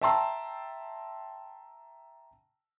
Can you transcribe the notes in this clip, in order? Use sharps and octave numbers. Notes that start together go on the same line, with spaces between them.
E5 G5 A5 A#5 C6 E6